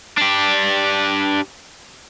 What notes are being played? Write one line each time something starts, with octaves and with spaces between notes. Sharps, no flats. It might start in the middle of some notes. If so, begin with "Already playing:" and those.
D4 G4